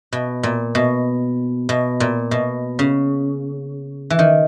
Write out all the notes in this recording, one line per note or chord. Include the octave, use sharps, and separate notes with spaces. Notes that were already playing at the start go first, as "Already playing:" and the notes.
B2
A#2
B2
B2
A#2
B2
C#3
E3
D#3